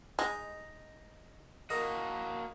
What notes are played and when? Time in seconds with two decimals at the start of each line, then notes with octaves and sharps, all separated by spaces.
0.19 G#3 D#4 A#5
1.70 A#3 F#4 A#4 D#5